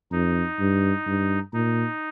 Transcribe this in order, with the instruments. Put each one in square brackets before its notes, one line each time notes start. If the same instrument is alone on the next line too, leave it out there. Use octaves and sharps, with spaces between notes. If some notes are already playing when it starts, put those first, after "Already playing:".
[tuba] F2 [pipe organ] D#4
[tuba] G2
G2
[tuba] A#2 [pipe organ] D#4